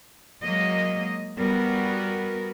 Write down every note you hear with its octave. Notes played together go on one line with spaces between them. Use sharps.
F#3 G#3 A#3 D#5
G3 B3 F#4 A#4